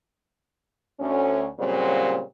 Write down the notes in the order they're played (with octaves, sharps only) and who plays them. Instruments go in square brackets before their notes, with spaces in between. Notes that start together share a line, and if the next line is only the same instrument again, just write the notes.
[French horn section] D2 C#4
A#2 C#3 F#3 G3 C4